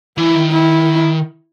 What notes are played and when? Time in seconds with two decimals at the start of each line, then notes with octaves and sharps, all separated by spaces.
0.17 E3 E4
0.35 D#3
0.51 E4